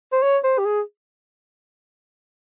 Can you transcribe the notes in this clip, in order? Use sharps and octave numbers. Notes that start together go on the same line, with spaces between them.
C5
C#5
C5
G4
G#4